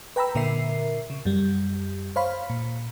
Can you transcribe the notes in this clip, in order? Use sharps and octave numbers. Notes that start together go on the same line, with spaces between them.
B4 G5 A#5 B5 E6
A#2 D3 A#4 E5 C7
C#3
F#2 G3
C5 C#5 F5 B5
A#2